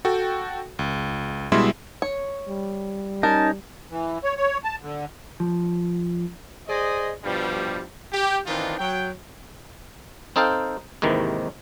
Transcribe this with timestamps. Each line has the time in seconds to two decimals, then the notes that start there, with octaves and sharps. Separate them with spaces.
0.05 F#4 A4 G5
0.79 C#2
1.52 B2 G3 G#3 E4 E5 C6
2.02 C#5
2.48 G3
3.23 C#4 D#4 A#4 A5
3.91 E3
4.24 C#5
4.37 C#5
4.64 A5
4.82 D3
5.40 F3
6.68 G#4 C5 D5 D#5
7.24 G2 B2 F3 G3
8.13 G4
8.47 D#3 E3 C4 D4 D#4 F4
8.78 F#3 G5
10.36 C4 D#4 A4 C5 F5 G5
11.02 D#2 G#2 C3 D#3 E3